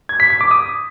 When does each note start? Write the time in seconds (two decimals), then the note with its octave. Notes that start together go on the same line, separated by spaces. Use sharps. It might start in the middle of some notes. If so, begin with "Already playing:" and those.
0.09 G#6
0.20 B6
0.30 B6
0.41 D6
0.51 D#6